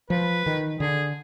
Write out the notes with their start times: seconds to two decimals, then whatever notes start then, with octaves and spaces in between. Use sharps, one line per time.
0.10 F3 B4
0.46 D#3
0.80 D3 G#4